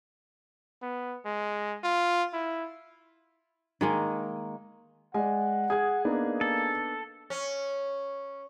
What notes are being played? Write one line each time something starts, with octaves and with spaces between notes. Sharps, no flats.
B3
G#3
F4
E4
D#3 G#3 A#3
G#3 D5 F#5 G#5
G#4 D#6 G#6
A#3 B3 D4 D#4
A4
C#4